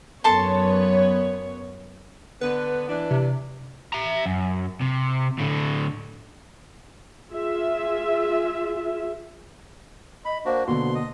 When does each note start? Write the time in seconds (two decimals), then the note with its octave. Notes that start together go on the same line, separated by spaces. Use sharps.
0.24 F#2 B3 A4 C#5 A5 C6
2.41 D3 B3 B4
2.89 E3 D4
3.11 C3
3.93 E5 A#5
4.26 F#2
4.81 C3
5.39 A2 D3
7.29 F4 G#4 E5
10.25 D#5 B5
10.45 A#3 D4 F#4 C5
10.67 B2 D3 A#3 B3 C6
10.95 D#5